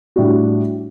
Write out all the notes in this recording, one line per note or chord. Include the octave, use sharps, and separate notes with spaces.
A2 G3 D4 F#4